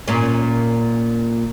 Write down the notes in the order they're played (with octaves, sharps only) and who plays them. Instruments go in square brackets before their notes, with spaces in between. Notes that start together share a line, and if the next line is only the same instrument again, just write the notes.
[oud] A#2 C#4